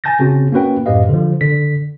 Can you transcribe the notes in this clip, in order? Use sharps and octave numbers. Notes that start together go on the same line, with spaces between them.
G#5 A5 G6 A6 A#6
C#3 C4 F#4
A#3 C#4 F#4 B4 G5
F#2 A2 G4 B4 D#5 F5
D3 F3
D3 B6